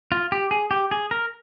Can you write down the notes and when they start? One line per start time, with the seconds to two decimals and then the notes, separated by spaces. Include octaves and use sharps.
0.12 F4
0.32 G4
0.51 G#4
0.71 G4
0.91 G#4
1.11 A#4